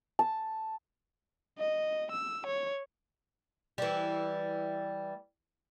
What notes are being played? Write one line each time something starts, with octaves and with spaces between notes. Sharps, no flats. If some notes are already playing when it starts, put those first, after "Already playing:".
A5
D#5
E6
C#5
E3 G3